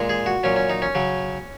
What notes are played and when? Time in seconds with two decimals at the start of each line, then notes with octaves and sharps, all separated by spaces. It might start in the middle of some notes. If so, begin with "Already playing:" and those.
Already playing: A#2 G#3
0.09 G#4
0.26 F#4
0.43 A#2 F#3 C#4
0.56 C#4
0.69 D#4
0.82 C#4
0.95 C#3 F#3